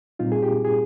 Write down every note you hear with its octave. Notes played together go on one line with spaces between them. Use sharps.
A#2 G3 C4 D#4 F4
G#4
G4
G#4